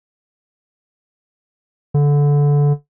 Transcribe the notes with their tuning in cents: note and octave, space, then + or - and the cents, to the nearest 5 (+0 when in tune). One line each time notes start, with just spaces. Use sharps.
D3 -20